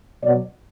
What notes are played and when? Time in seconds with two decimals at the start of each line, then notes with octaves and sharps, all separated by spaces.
0.24 B2 F#3 D5